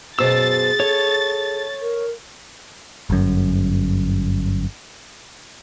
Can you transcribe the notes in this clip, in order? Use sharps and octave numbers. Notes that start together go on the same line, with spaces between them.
F#2 B2 G#4 C5 E6 A6
A4 C#5
A#4
G1 F#2